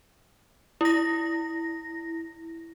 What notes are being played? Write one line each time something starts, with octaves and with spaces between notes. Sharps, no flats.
E4 A#6